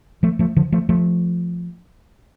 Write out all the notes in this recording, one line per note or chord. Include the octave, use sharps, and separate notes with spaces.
F3 A3
F3 A3
D3 F3
F3 A3
F3 A3